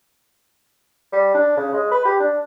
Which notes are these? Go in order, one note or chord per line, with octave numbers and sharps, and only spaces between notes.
G3
D4
C#3
G#3
B4
G4
D4